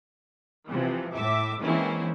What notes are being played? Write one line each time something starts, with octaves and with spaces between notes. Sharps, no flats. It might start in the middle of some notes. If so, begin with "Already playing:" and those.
C3 E3 F3
A2 E5 D6
E3 G#3 A#3 C4 C#4 E4